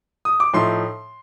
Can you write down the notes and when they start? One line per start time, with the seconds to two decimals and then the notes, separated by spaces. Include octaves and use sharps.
0.25 D#6
0.40 D6
0.53 A2 F3 A3 D#4 C6